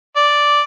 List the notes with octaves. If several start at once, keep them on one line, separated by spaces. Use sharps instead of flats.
D5